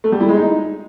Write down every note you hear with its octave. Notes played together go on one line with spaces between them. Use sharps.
A3
G3
E4
G#3
D#4